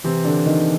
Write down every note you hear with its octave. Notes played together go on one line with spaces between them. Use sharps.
C3 E3 C4
D3 D4
D#3 D#4